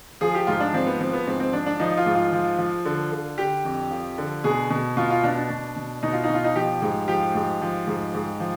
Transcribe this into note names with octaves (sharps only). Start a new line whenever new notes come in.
F3 G#4
G4
G#2 F4
D4
F3 C4
B3
F3 C4
B3
G#2 C4
C4
F3 D4
D4
F3 D#4
F4
G#2
F4
F3
F3
D3
D3
D3 G4
F2
F3
D3
B2 G#4
B2
B2 F4
F4
B2 D4
D4
B2
B2
B2 D#4
F4
D#4
B2 F4
D#4
F3 G4
G#2
F3 G4
G#2
F3
G#2
G#2
F3